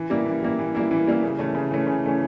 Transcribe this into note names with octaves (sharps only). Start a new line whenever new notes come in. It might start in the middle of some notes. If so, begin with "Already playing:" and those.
Already playing: E3
G3 A#3 E4
E3
G3 A#3 E4
E3
G3 A#3 E4
E3
G3 A#3 E4
C#3
E3 A3 C#4
C#3
E3 A3 C#4
C#3
E3 A3 C#4